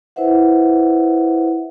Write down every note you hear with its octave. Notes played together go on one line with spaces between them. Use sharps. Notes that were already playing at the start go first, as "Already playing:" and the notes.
E4 B4 C5 E5 F#5